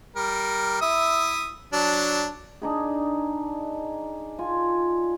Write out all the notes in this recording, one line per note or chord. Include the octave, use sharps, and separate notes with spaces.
G3 A#4
E4 E5 D#6
F#3 D4 A5
D4 D#4 G#4
F4 G#5